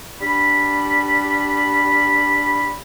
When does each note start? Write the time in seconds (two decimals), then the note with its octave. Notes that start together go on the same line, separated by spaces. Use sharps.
0.21 G3 D4 B5